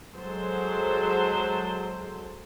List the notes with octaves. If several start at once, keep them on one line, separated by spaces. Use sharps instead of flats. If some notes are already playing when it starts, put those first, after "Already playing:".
F#3 G#3 A4 C5